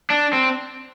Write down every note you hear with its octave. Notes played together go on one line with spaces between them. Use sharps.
D4
C4